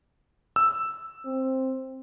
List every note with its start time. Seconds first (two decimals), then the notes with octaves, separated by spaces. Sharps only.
0.56 E6
1.25 C4